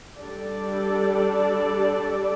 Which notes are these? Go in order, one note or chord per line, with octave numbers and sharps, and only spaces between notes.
G3 D4 A4 D5